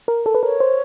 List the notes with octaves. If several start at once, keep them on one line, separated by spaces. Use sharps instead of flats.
A#4
A4
B4
A#4 C#5
C5